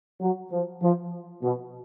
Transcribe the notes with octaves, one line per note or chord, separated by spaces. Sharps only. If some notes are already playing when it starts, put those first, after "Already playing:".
F#3
F3
F3
B2